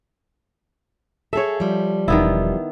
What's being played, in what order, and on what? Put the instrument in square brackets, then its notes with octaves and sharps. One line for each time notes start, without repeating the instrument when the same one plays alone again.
[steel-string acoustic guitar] G#4 A4 [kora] C#5 E5
[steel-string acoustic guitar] F3 G3
[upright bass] E1 [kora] D#3 B3 E4